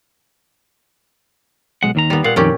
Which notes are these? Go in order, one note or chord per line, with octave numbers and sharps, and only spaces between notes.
B1 G#3 F#5
D#2 D#3 A#5
G3 B3
A#2 F5 F#5
F2 A#2 D#3 C#4 G4